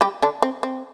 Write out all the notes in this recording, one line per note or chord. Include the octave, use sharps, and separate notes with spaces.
G3 G4
D3 D4
C4
C4